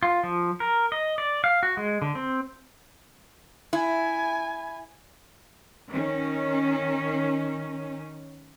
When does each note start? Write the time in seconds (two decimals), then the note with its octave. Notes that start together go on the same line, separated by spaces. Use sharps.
0.03 F4
0.23 F3
0.60 A#4
0.92 D#5
1.18 D5
1.44 F5
1.63 F#4
1.77 G#3
2.02 D3
2.15 C4
3.73 E4 G#5
5.89 D#3 C#4